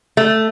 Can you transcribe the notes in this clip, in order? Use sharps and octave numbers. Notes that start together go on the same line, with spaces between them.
A3